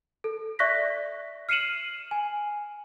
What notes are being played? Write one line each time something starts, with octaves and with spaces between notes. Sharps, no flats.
A4
D5 E5 C#6 F#6 A#6 B6
F6 C7 C#7 D#7 E7 F#7
G#5